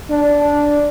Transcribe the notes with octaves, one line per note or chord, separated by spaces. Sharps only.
D4